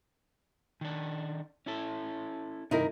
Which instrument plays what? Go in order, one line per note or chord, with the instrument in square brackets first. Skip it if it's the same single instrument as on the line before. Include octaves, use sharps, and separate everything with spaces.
[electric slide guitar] D#3 D4
C#4 E4 A4
[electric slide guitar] G2 C3 D#3 [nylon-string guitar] D#4 E4 A#4